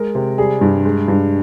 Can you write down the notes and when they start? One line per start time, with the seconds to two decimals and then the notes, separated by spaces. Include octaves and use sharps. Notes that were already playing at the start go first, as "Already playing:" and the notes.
Already playing: G#3 A#4
0.15 C3
0.38 G3 G#4
0.61 G2
0.85 G#3
1.08 G2